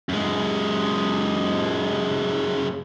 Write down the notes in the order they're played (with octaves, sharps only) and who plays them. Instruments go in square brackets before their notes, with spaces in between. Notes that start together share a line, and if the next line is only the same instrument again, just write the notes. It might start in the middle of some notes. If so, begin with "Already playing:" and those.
[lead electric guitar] F#2 G#3